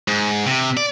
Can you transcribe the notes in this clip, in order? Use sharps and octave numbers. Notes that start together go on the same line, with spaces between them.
G#2
C3
D5